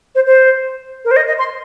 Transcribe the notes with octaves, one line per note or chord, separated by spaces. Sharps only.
C5
C5
A#4
C5
D#5
D#5
C6